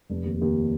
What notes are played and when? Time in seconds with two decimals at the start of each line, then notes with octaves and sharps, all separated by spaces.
0.10 F1
0.25 D#2
0.41 D#2